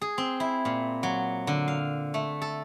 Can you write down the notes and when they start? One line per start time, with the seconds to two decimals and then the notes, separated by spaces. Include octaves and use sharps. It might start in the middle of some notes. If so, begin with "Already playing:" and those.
0.01 G#4
0.18 C4
0.40 E4
0.65 A#2
1.03 F#3
1.47 D3
1.68 F5
2.14 A3
2.42 A4